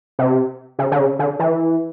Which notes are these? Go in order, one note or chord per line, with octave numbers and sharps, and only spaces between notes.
C3
C#3
D3
C#3
D3
E3